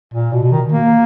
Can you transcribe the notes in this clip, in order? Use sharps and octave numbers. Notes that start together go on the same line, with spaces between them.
A#2
B2
B2
D#3
A#3